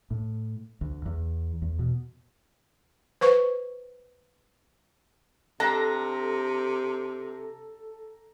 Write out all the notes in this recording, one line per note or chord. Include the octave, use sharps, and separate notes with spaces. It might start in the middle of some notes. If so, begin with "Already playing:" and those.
A2
D2
E2
E2
B2
B4 C5 C#6
C3 D4 G4 A4 A#5